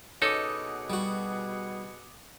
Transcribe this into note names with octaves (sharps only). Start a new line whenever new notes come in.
B2 C#4 D#4 G#4 A4 F#5 D6 D#6
G3 F#4